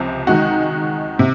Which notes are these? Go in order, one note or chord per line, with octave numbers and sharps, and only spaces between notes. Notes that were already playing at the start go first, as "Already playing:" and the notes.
Already playing: C#2 C3 F3 C4
D#3 G#3 D#4 F#4
C3